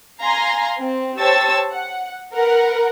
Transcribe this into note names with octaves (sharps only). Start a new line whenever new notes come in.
F5 G#5 A#5 C6
C4
G4 C5 C#5 A5 E6 A6
F#5
A#4 B4 F#5